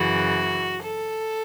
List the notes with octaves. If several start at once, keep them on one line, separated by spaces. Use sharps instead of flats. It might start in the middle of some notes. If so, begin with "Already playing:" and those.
Already playing: F#2 C#3 E3 F#4
A4